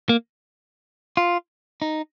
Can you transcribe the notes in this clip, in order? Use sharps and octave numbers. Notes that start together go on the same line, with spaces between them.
A#3
F4
D#4